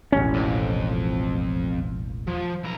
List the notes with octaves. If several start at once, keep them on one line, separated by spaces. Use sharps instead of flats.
E1 A1 C#4
F2
F3
B1 A#5